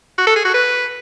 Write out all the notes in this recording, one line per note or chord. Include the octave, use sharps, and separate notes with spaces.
F#4
A4
G#4
F#4
B4